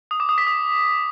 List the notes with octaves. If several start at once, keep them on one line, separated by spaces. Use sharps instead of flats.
D#6
D6
D#6
B6
D#6